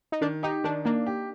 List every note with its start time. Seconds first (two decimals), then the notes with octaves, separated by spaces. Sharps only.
0.12 D#4
0.21 D#3 D4
0.43 D#4 G4
0.64 D#3 D4
0.85 A#3 D4
1.06 G4